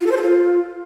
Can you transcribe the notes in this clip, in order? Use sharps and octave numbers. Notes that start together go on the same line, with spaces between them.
F4
A4
C5
A4
F4